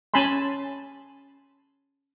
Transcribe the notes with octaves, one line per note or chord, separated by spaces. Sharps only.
C#4 G#5 A5 B5 C6